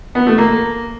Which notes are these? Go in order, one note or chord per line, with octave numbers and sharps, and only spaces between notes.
B3
A3
A#3